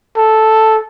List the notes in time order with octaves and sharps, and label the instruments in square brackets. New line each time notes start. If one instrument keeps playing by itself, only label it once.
[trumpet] A4